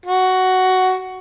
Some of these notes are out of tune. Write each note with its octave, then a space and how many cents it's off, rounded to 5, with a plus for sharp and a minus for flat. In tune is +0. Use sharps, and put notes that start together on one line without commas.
F#4 +10